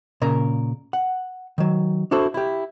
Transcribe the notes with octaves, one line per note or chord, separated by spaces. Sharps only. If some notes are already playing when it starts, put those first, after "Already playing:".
A#2 C#3 A#4 A#5
F#5
D#3 F#3
D4 E4 F#4 A4 C5
E4 G4